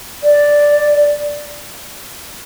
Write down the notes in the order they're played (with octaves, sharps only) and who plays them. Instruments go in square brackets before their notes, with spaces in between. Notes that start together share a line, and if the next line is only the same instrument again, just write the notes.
[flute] D5